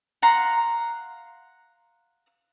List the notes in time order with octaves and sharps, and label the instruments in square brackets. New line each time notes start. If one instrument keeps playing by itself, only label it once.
[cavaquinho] F5 F#5 A#5 C6